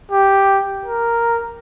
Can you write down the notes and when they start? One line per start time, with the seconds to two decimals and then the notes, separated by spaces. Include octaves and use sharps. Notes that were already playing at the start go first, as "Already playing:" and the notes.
0.11 G4
0.85 A#4